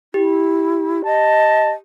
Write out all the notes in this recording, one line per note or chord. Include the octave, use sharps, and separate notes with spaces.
E4 G4
D#5 A5